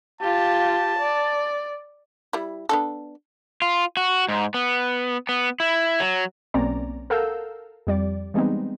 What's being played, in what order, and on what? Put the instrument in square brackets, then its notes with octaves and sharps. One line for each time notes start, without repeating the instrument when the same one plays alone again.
[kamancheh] F4 G4 [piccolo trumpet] A5
[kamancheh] D5
[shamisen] G3 E4
B3 D4 A4
[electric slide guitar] F4
F#4
G#2
B3
B3
E4
F#3
[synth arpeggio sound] B1 A#3 C4 C#4 D5 A#5
A4 A#4 F5 F#5 E6 G6
F2 G3 D5
E3 G3 G#3 B3 C4 D#4